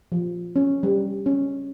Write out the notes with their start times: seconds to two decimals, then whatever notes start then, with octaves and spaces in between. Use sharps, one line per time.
0.12 F3
0.56 C#4
0.83 G3
1.26 C#4